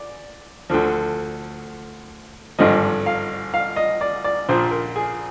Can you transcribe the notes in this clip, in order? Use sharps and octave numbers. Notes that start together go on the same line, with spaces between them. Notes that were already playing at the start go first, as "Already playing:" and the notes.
Already playing: D5
D2 D3 F3
G#1 G2 D3 F3 D#5
F5
F5
D#5
D5
D5
A#1 A#2 F3 C5
A#4
G#4